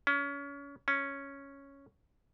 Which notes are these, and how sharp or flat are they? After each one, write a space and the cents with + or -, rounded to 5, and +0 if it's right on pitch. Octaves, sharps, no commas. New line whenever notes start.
C#4 +30
C#4 +0